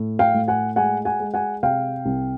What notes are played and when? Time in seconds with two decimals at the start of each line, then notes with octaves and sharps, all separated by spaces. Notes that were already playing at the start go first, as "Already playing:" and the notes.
Already playing: A2
0.19 F5 G5
0.34 A2
0.48 F#5 G#5
0.76 G#3 F#5 G#5
1.05 F#5 G#5
1.20 G#3
1.34 F#5 G#5
1.63 C3 F5 G5
2.06 C2